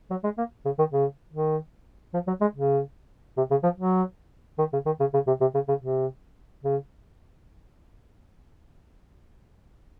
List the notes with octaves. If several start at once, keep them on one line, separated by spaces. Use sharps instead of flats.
F#3
G#3
A#3
C#3
D#3
C#3
D#3
F3
F#3
G#3
C#3
C3
C#3
F3
F#3
D#3
C#3
D#3
C#3
C#3
C3
C3
C#3
C#3
C3
C#3